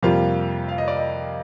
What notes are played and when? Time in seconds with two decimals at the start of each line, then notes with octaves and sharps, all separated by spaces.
0.03 F2 C3 G3 A#3 F4 F5
0.68 F5
0.78 D#5
0.88 D5
0.97 D#5